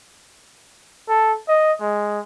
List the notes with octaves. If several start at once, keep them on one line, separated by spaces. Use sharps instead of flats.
A4
D#5
G#3